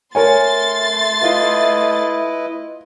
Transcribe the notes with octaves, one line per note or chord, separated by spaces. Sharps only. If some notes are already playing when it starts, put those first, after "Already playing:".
A3 A#4 C#5 G#5 C6 A6
E4 F4 B4 D#5